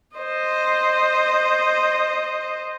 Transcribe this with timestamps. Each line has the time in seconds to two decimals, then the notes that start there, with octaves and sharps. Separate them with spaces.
0.16 C5 D#5